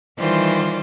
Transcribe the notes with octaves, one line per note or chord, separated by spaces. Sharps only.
D#3 E3 G3 F4 C5 D5